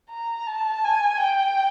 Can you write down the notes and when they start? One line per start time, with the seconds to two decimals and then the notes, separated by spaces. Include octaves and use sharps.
0.10 A#5
0.47 A5
0.85 G#5
1.21 G5